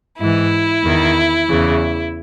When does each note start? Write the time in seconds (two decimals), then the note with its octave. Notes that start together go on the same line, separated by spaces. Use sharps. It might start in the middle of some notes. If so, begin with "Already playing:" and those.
0.19 G#2 E3 E4
0.84 E2 D#3
1.50 E2 C#3 E3